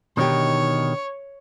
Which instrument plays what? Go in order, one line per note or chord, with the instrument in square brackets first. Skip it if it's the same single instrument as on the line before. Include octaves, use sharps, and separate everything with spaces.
[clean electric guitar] B2 D#3 [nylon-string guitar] D3 D#4 G4 [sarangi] C#5